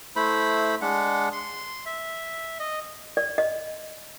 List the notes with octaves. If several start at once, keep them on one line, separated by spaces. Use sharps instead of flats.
A3 E4 C5 B5
G#3 D4 F#5
C6
E5
D#5
D5
D#5